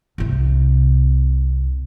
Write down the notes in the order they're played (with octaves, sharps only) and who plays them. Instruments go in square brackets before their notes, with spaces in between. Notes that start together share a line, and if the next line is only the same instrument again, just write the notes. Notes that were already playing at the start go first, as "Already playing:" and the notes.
[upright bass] C2 C3